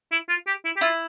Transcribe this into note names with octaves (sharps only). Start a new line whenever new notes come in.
E4
F4
G4
E4
G4
E4 F4